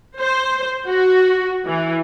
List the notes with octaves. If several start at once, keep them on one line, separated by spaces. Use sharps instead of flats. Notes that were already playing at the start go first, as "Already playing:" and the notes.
C5
F#4
E3